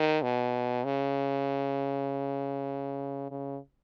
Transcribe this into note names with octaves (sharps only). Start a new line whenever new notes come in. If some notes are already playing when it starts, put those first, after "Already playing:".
Already playing: D#3
B2
C#3
C#3